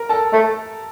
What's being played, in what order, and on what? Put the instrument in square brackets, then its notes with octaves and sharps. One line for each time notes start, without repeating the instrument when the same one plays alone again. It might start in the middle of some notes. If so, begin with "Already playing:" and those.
Already playing: [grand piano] A#4 A#5
A4 A5
[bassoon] A3